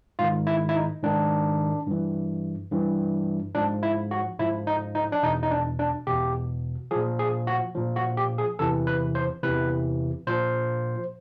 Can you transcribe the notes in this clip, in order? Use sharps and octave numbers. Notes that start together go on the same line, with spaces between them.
G#2 D#3 F4
E4
E4
D#4
G#2 D#3 D4
G2 E3
G2 E3
G#2 F3 D4
E4
F#4
G#2 F3 E4
D#4
D#4
D4
E2 B2 D#4
D#4
D4
D4
E2 B2 G4
A#2 F3 G#4
G#4
F#4
A#2 F3
F#4
G4
G#4
E2 C3 E3 A4
B4
C5
E2 C3 E3 B4
A#2 F3 C5